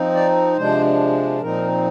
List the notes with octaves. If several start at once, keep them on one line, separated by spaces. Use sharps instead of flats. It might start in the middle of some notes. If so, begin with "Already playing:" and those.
Already playing: F3 C4 D#4
D5
C3 F3 G#3 D4 C5
A#2 F3 C4 D#4 A#4